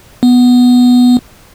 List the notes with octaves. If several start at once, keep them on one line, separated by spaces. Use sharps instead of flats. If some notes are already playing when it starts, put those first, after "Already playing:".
B3